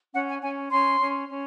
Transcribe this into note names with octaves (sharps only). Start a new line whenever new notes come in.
C#4 F#5
G#5
C#4 G#5
C#4 C6
C#4
C#4